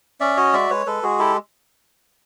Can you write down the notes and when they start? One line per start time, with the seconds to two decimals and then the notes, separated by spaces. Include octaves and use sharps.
0.20 C#4 D5 E5
0.37 F#4 C#5 D#5
0.53 G#3 D5 E5
0.70 G#3 B4 C#5
0.86 G#3 A4 B4
1.03 G#3 F#4 G#4
1.19 E4 G4 A4